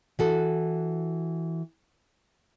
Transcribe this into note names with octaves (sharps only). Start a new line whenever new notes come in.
E3 F#4 A4